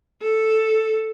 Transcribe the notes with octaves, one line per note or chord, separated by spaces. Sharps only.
A4